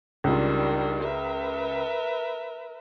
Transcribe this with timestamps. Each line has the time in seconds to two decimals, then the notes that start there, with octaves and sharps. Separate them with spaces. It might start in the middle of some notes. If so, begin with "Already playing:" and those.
0.24 C#2 D#3 G3 D4 F4
1.03 A#4 B4 E5